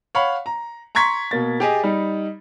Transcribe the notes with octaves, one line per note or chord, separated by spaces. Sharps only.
C#5 F5 F#5 B5
A#5
A#5 C6 C#6 G#6 B6
B2 A#3 A6
G4 G#4 D#5
G3 D#4